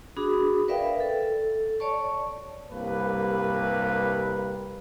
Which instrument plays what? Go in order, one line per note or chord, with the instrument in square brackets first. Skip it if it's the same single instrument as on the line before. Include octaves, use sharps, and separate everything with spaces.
[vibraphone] D4 F#4 G#4 B5 D#6
A#4 B4 D5 E5 F5 G5
A4
C#5 D5 A5 C#6
[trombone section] C2 G2 G3 A#3 B4